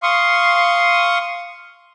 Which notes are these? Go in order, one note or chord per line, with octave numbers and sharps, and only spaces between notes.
F5 C6 C#6 D#6